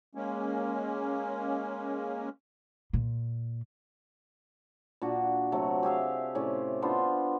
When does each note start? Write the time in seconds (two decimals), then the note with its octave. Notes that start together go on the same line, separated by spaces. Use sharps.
0.15 G#3 A#3 C#4
2.93 A#2
5.02 A#2 D4 F#4
5.52 C3 F#3 A3
5.83 G4 G#4 E5 F5
6.35 A2 C3 C#4 D5
6.82 B3 D4 F4 C5